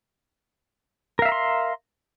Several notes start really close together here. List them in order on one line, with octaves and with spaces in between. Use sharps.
A#4 F5 E5 A#5 C6